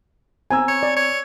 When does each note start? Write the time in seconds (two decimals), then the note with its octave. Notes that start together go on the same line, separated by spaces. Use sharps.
0.51 C4 G#5 A#5 E6
0.68 C#5
0.83 D5
0.97 C#5